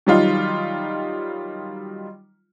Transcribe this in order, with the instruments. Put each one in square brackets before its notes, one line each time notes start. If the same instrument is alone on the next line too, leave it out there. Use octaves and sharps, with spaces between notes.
[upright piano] D#3 F#3 G3 D#4 F4